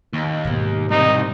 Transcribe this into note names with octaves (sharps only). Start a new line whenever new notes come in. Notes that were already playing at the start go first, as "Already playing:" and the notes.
D#2
G#2 B2
C2 C3 D#4